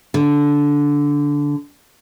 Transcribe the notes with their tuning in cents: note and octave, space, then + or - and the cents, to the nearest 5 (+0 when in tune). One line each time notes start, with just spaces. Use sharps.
D3 -15